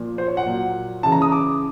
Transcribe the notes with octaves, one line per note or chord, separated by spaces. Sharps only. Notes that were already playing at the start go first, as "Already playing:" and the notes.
Already playing: A#2 F3
C5
C#5
F#5
A#2 F#3
C#3 E3 A5
A#5
D#6
D6